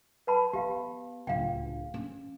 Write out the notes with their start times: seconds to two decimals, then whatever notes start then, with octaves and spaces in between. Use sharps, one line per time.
0.27 B4 A5 B5
0.53 B3 G4 F5
1.27 D1 C#2 D4 F5 G5
1.94 C#4